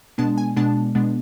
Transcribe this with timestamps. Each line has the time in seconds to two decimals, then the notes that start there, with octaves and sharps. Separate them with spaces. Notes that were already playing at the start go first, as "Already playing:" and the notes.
0.18 B2 G#3 B3 D4 A5
0.38 G#5
0.57 B2 G#3 B3 D4 A5
0.95 B2 G#3 B3 D4